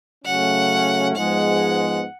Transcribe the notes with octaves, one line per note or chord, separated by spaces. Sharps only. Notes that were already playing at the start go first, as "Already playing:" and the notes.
C#3 F#3 A3 C#4 F#5
G#2 F3 G#3 B3 F#5